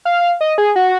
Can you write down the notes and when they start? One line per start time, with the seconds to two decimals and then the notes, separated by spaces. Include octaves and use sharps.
0.05 F5
0.41 D#5
0.58 G#4
0.76 F#4